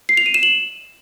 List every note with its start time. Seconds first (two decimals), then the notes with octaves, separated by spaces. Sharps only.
0.09 C7
0.17 F7
0.26 D#7
0.34 E7
0.43 F#7